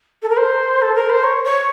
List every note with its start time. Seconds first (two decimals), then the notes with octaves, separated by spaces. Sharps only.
0.22 A4
0.29 A#4
0.37 C5
0.82 A4
0.95 A#4
1.10 C5
1.23 C#5
1.44 C#5